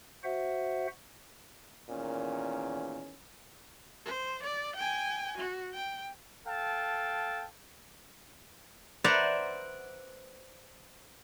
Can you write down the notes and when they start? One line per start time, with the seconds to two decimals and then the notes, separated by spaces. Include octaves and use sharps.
0.24 F#4 C5 E5 F#5
1.89 E2 A#2 D#3 C#4
4.05 C5
4.43 D5
4.76 G5 G#5
5.38 F#4
5.73 G5
6.46 A4 F5 G5 A5
9.04 B4 C5 D5 E5 F#5 A#5